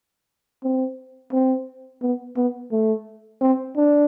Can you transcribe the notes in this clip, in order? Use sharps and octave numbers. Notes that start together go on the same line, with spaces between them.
C4
C4
B3
B3
A3
C4
D4